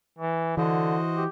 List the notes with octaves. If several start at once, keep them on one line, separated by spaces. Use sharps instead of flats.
E3
D3 E3 F#4 C5 D#5
G4